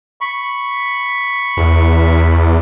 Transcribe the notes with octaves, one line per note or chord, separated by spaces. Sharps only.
B5 C#6
E2